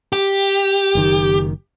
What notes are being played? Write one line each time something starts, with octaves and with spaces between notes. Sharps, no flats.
G4
F#1 D#3